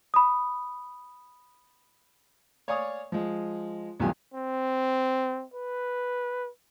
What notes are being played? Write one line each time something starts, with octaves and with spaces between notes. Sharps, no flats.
B5 D#6
C#5 D5 F5 G#5 C#6 D#6
F3 G#3
B1 E2 G2 F4 G4 G#5
C4
B4